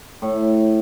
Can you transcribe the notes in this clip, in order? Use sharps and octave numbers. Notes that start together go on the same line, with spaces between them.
A2